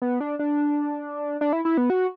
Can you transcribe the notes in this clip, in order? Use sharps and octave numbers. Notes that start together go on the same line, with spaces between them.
B3
D4
D4
D4
E4
E4
B3
F#4